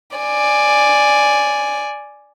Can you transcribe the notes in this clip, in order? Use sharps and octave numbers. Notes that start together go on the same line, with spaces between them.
D5 G#5